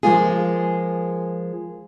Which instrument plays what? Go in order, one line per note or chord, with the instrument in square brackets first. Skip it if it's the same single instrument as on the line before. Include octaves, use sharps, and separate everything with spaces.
[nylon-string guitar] F3 G#3 A#3 F4 G#4